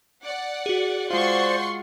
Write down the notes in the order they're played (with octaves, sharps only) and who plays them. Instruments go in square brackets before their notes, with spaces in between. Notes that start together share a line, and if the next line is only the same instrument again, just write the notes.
[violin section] D5 F#5
[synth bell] F#4 G#4
[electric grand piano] G#3 F4 [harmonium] C5 D5 [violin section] F#5 C6 C#6